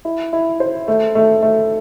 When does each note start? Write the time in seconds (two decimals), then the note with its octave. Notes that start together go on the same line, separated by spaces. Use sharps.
0.05 E4
0.33 E4
0.60 C5
0.88 A3
1.15 A3
1.43 A3